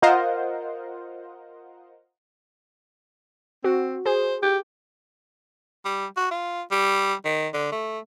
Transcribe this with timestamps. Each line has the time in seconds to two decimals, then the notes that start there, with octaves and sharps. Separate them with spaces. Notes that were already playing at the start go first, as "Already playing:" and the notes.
0.02 F4 A#4 C5 D#5 F5 F#5
3.64 C4 F#4
4.06 G#4 C5
4.43 G4
5.85 G3
6.16 F#4
6.31 F4
6.71 G3
7.25 D#3
7.53 D3
7.72 A3